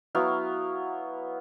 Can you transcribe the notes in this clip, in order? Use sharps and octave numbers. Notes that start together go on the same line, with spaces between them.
F#3 B3 E4 F5